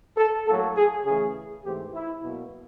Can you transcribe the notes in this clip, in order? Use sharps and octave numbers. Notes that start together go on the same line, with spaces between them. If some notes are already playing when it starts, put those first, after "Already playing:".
A4
A2 F#3 A#3 A4
G#4
C#3 E3 A3 G#4
G#2 E3 A3 C4 G4
E4
B2 F#3 A#3